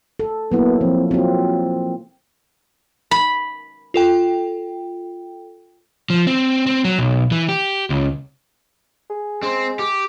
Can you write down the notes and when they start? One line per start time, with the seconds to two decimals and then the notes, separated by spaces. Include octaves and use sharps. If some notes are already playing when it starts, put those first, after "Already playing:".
0.20 A4
0.52 F#3 A#3 B3 E4
0.81 F3 C4
1.11 F#3 C4 F4
3.11 B5
3.94 F4 A4 G5
6.10 F3
6.27 C4
6.66 C4
6.84 F#3
6.99 B1
7.32 E3
7.49 G4
7.90 C#2
9.10 G#4
9.43 G#3 C4
9.79 G4